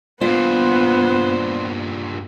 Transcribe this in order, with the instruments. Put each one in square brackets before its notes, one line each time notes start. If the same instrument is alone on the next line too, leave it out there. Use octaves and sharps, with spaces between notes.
[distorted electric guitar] G2 A#2 [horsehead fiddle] B3 [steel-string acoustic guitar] F4 [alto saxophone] C5